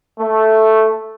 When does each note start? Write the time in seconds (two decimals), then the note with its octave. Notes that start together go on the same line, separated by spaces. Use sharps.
0.20 A3